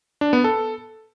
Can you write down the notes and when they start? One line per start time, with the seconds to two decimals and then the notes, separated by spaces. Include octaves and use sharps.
0.21 D4
0.33 B3
0.44 A4